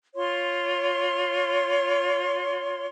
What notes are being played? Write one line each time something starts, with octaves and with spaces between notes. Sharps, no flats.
F4 C#5 C6